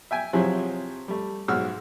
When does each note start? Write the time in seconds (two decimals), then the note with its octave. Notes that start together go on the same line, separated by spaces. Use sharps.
0.11 E5 G5 G#5
0.33 C3 F3 F#3 E4 G#4
1.08 G3 A3
1.48 B1 G#2 F#4 E6 F6